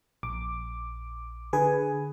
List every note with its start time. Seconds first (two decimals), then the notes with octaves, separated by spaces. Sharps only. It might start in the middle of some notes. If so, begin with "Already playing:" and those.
0.23 A#1 D6
1.53 D3 G#4 B4 G#5